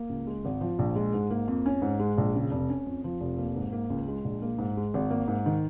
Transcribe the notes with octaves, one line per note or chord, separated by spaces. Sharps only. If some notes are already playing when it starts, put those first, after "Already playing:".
Already playing: A#3
C#2
G#3
G#1
F3
A#1
G#3
G#2
A#3
F2
C#4
G#2
G#3
A#1
C#3
F1
C#4
F2
F3
F1
A#3
G#2
A#3
C#2
G#3
A#1
A#3
G#2
G#3
G#1
A#3
G#2
D#3